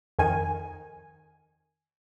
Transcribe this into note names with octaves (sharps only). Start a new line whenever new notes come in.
F2 D#3 G#5